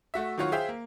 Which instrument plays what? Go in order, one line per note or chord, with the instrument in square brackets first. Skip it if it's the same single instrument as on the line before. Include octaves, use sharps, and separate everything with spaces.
[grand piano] A3 F#4 E5
D#3 F#3 F4 F#4 C#5
G#4 C5 E5 F5 G5
A#3